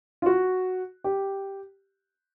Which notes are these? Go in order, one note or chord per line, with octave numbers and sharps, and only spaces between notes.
F4
F#4
G4